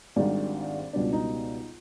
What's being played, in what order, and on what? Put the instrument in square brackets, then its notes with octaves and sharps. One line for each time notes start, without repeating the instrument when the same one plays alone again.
[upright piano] G#1 G#2 D#3 G3 D4
C#2 B2 G3 B3 D4
D#4